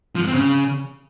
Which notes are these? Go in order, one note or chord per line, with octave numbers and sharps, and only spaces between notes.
F3
G#2
C4
C#3